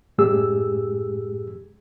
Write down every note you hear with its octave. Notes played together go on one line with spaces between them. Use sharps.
F#2 A2 G#3 G4 G#4 E6